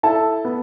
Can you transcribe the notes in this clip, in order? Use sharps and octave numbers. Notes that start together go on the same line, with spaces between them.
E4 A4 A5
B3